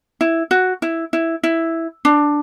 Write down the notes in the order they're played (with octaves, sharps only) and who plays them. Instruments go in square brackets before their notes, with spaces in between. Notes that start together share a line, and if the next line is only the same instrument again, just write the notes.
[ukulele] E4
F#4
E4
E4
E4
D4